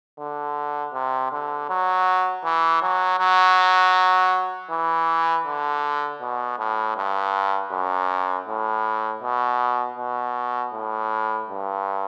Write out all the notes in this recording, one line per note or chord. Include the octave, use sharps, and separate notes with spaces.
D3
C3
D3
F#3
E3
F#3
F#3
E3
D3
B2
A2
G2
F#2
A2
B2
B2
A2
G2